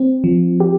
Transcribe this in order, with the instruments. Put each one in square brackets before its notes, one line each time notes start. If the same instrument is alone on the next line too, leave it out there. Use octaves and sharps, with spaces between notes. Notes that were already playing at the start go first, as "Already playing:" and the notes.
Already playing: [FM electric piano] C4
F3
G4